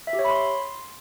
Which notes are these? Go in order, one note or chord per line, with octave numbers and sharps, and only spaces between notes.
E5
G4
C#5
B5
C6